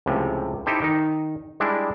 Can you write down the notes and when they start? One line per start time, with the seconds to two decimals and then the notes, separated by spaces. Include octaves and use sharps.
0.06 C#2 A2 C3 F3
0.66 D#4 E4 G4 A4 C5
0.82 D#3 D#4
1.60 G3 G#3 D4 E4